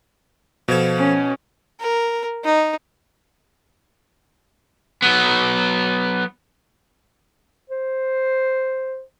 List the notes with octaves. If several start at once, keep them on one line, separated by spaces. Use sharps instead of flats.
B2 F3 A4 G#6
C#4
A#4
D#4
F#3 B3
C5